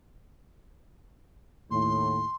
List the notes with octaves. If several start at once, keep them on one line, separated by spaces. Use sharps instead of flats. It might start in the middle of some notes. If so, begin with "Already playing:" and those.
D#2 A2 C6